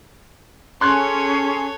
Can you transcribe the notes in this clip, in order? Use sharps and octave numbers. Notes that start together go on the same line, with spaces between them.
C#4 G#4 A4 C#5 C6 F#6 G#6